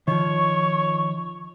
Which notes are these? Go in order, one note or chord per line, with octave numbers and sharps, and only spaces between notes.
D#3 F3 C#5 C#6